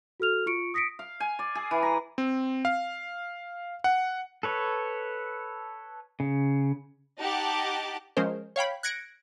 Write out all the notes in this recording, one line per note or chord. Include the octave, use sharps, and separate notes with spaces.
F#4 A4 F6 F7
F4 C#6 C#7 D7
D#6 A#6 B6 C#7 D7
F5
G#5
D5
G#4
E3
A#5
C4
F5
F#5
A4 B4 C#5
C#3
D#4 G4 F#5 A5 D6
F3 G#3 C#4 A#4 C5
C#5 F5 G5 B5
F#6 G#6 A#6 C#7 D7